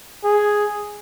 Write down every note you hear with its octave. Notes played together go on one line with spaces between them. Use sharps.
G#4